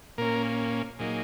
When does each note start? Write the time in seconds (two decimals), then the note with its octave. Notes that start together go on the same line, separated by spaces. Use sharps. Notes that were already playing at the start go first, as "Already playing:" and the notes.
0.18 A#2 A#3 C#4 A#4
0.99 A#2 F#3 A#3 D#4 G#4